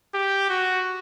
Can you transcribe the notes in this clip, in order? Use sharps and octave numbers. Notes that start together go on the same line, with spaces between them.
G4
F#4